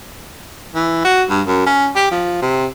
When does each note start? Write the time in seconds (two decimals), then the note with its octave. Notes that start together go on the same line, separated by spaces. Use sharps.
0.75 E3
1.05 F#4
1.30 G2
1.47 F#2
1.66 C#4
1.96 G4
2.11 F3
2.42 C3